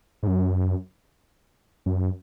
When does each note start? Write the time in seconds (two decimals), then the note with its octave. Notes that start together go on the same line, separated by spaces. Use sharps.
0.23 G#2
0.27 F#2
1.86 F#2